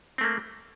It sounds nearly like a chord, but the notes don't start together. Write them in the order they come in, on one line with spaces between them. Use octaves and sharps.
C4 A3 A#3